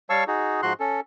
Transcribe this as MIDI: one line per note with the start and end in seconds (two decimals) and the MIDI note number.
0.10 0.24 55
0.10 0.24 73
0.10 0.24 77
0.10 0.24 81
0.10 0.24 85
0.10 0.24 88
0.28 0.61 63
0.28 0.61 66
0.28 0.61 68
0.62 0.73 44
0.62 0.73 53
0.62 0.73 66
0.62 0.73 84
0.62 0.73 90
0.80 1.00 61
0.80 1.00 69